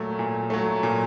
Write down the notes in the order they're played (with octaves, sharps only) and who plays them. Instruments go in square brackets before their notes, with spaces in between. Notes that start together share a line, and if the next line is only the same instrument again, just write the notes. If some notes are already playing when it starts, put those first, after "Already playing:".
Already playing: [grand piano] A#2 F#3 A3
A#2
F#3 A3
A#2